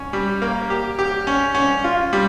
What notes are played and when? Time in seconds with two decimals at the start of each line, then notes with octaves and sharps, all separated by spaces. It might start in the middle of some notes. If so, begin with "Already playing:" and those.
Already playing: C#4
0.13 G3
0.42 A#3
0.70 G4
0.99 G4
1.27 C#4
1.55 C#4
1.84 F4
2.13 G3